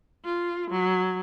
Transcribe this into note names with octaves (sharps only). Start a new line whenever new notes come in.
F4
F#3